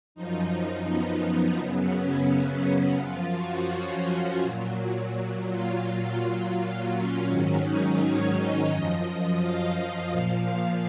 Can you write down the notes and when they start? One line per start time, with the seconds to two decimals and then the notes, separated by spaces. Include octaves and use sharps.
0.15 F#2 F3 D#4
0.86 B3
1.22 B3
1.58 F#2 C#3 F#3 B3
1.93 C#4
3.00 F#2 F3 F4
3.36 F#4
3.71 C#4
4.42 A#2 F#3
5.49 F4
5.84 A#2 F#3
6.91 C#4
7.26 G#2 D#3 F#3
7.62 D#4
7.97 C#5
8.33 D#5
8.69 F#2 F3
9.40 F5
10.11 A#2 F3
10.46 F5